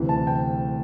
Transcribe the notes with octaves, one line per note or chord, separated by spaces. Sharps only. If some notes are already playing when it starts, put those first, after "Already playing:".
Already playing: D2 C3 E3
A5
G5